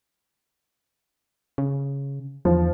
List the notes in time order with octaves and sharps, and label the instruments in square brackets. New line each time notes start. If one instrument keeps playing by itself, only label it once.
[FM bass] C#3
[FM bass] E2 [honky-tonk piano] F3